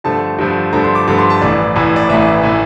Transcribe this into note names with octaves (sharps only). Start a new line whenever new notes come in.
G2 D3 F3 A3 A5
G2 D3 F3 A3
G2 D3 F3 A3 A#5
C6
D6
G2 D3 F3 A3 D6
C6
A5
A1 A2 E3 D5
A1 A2 E3
D5
A1 A2 E3 E5
A2 E3